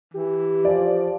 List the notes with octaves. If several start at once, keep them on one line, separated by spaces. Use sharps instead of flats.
E3 G4
F3 D5